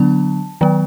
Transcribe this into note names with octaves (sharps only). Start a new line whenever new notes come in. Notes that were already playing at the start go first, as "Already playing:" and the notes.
Already playing: D3 F#3 B3 D4 A5
D#3 F#3 B3